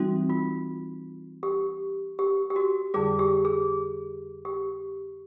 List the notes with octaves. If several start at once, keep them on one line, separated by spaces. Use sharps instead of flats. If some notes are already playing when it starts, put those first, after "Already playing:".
Already playing: E3 G3 C4 D#4 E4 F#4
F4
G4
G4
G4
F#4
F2 D3 G3 G#4
G4
G#4
G4